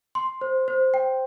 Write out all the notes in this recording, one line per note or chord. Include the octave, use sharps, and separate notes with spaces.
C6
C5
C5
G5